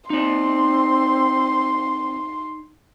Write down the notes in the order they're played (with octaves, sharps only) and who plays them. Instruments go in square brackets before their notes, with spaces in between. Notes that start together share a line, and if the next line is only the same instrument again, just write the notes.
[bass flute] C4 [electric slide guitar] D#4 D5 [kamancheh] C6